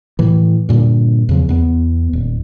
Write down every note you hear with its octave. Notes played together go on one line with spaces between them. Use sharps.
A2 E3
G2 A#2 D3
E2 C#3 F3
E2 B3
D#1